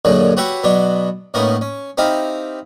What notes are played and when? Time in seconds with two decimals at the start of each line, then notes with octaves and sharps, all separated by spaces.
0.05 F#2 A#2 D3 F#3 G#3
0.37 F#4 G4 B4 C#5 E5 F#5
0.64 B2 F#3 B3 D4
1.34 A2 A#3 B3 C#4 D#4
1.61 C#4
1.98 C4 D#4 E4 G4 F5